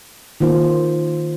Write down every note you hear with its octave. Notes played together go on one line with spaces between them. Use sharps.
D#3 A#3 F4 C5